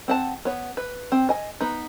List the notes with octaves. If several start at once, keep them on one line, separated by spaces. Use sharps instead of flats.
C4 F#5 A5
B3 C#5
B4
C4
D#5 G#5
B3 D#4